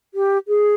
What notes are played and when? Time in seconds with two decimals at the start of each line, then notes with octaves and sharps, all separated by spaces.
0.14 G4
0.48 G#4